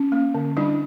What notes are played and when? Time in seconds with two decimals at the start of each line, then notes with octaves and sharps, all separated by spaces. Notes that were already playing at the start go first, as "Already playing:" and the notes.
Already playing: C#4
0.12 A#3
0.34 D3
0.57 G3 D4 E4